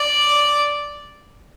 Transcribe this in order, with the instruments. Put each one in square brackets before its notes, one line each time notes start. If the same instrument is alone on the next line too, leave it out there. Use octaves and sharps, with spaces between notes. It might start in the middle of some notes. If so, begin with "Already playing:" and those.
Already playing: [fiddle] D5